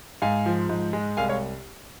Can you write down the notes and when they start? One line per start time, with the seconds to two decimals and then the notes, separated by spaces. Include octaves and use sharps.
0.22 G#2 F5 G#5
0.46 F3
0.69 G#2
0.93 G#3
1.17 C2 F5 G#5
1.29 C#5 F5